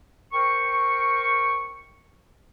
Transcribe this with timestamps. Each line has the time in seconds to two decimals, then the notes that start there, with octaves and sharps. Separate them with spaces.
0.33 A#4 C5 G5 C#6